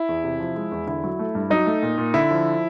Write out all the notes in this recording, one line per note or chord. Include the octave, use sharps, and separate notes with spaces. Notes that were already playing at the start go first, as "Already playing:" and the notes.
Already playing: E4
E2
C3
F3
G#3
E2
D3 E4
F#3
A3
G2
F#3 D#4
A3
A#2
A#2
D3 E4
F3